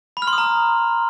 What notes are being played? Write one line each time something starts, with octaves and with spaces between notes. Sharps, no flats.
B5
F6
C6
D#6
A#5